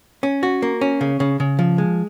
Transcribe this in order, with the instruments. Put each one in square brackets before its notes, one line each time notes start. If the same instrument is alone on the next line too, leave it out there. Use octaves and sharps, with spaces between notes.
[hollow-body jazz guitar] C#4
F#4
A#3
C#4
C#3
C#3
C#3
F3
G#3